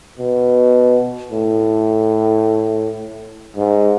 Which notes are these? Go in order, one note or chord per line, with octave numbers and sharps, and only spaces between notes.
B2
A2
G#2